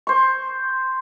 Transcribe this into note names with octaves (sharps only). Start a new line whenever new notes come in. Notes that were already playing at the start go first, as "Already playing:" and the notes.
C5 C#6